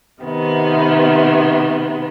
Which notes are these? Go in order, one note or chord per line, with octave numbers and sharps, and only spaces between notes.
C3 D#3 B3